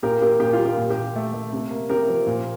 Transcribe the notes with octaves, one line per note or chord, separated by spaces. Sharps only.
A#2 G4 A#4
A#3 G4 A#4
A#2 G4
F4
G3
G4
A#2
G4
A#2
A3
A3
C3
A#3
C3 G4 A#4
F3
A#2